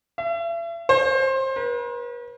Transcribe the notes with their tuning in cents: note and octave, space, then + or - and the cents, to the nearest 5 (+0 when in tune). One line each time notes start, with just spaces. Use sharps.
E5 +40
C5 +25
B4 -45